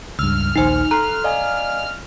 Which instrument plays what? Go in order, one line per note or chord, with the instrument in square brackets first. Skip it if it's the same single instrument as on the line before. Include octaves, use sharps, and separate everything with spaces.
[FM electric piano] C#2 G2 [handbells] E6 [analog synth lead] F6
[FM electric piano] A#1 D#2 C5 [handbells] D#4 G#5
[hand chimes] A4 [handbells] A#5 [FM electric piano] C6 F#6
[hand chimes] D5 F5 G#5 [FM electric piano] D#5